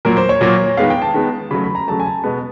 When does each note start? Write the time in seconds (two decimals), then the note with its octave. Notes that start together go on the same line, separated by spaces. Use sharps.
0.05 A#2 F#3 A#3 A#4
0.17 C5
0.29 C#5
0.41 A#2 F#3 A#3
0.77 D#3 G#3 B3 F5
0.90 G5
1.02 A5
1.14 D#3 G#3 B3
1.51 C#3 F#3 A3 B5
1.63 B5
1.75 A#5
1.88 C#3 F#3 A3 A5
2.00 G#5
2.06 A5
2.24 B2 G#3 B3